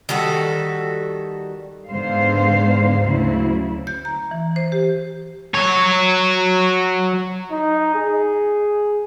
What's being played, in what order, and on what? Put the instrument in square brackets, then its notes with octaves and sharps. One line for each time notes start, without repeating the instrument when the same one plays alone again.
[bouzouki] D#3 G3 F#4 A4
[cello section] G#2 D3 G#3 B3 C5 F5
D2 C#3 F#3 E4
[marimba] G6
A#5
E3
C5
G4
[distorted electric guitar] F#3 C#5
[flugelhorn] D#4
G#4